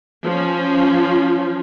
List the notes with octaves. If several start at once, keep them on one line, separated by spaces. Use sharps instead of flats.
F3 C#4